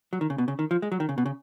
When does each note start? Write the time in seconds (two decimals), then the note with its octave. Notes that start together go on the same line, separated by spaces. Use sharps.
0.13 F#3
0.21 D#3
0.30 C#3
0.38 B2
0.48 C#3
0.59 D#3
0.71 F3
0.82 G#3
0.92 F#3
1.00 D#3
1.09 C#3
1.18 B2
1.26 C#3